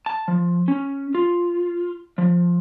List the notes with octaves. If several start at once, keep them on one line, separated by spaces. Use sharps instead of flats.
A5
F3
C#4
F4
F3